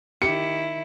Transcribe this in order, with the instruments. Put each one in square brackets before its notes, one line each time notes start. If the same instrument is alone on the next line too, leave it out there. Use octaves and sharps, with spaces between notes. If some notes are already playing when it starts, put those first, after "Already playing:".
[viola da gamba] D#3 E4 [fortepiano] G4 [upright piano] C#7